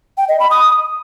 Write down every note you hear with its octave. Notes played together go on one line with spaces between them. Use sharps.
G5
D#5
B5
D#6